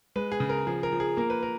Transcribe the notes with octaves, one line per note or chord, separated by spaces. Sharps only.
G#3 B4
G#4
C#3
A#4
F3 G#4
A#4
F3
G#4
A#3 A#4
B4
A#4